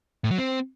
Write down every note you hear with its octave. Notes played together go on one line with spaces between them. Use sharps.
A2
F#3
C4